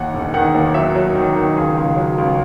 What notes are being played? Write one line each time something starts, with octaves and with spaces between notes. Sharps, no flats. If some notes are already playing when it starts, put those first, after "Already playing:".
Already playing: D#2 F#5
E1
D#3 F#5
D#2
F#3 E5
F#3
D#3
D#3
C#2 G#4
C#2
F#3
C#2